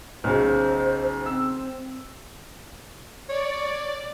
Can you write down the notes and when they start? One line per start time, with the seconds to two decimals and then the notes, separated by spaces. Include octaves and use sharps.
0.24 B1 C#3 C5
1.26 C4 E6
3.29 C#5 D5